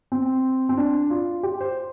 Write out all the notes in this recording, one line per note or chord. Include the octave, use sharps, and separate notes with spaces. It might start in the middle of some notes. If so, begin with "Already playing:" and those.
C4
C4
D4
F4
G4
C5